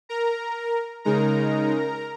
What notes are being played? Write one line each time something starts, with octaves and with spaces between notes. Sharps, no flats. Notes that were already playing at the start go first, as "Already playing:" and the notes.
A#4 A#5
C#3 G#3 D#4 A#4 A#5